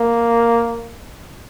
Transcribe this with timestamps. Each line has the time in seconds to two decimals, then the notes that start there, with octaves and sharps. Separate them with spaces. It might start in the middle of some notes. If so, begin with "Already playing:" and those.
Already playing: A#3